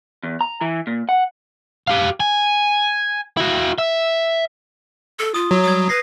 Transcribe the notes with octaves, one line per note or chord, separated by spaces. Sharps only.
E2
A#5
E3
A#2
F#5
G4 F5
G#5
E4 F#4
E5
A4
F4 D#6
F#3
G3 D#6 G#6
B4 A#6 C7